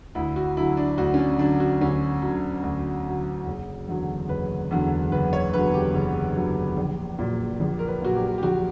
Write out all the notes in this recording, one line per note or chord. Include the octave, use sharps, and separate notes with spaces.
D2 E4
F#4
D3 F#3 E4
D4
D2 F#4
C#4
D4
D3 F#3 D4
F#4
D2 C#4
D3 F#3
D2
D3 F#3
F#1
E2 D3 F#3
F#1 B4
E2 D3 F#3
F#1 B4
C#5
E2 D3 F#3 B4
G4
F#1
E2 D3 F#3
A#1
A#2 F#3
A#1
A#4
B4
A#2 F#3 F#4
G4
G4
A#1 F#4